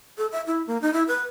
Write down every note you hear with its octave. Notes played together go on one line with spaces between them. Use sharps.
A4
E5
E4
A#3
D#4
E4
B4